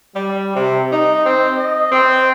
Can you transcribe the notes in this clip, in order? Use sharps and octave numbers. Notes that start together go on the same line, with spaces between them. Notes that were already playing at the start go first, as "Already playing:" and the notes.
G3
C3
D#4
C4
D#5
C4